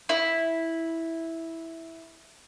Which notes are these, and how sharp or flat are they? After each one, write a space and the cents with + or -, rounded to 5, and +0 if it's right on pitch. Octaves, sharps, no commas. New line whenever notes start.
E4 -5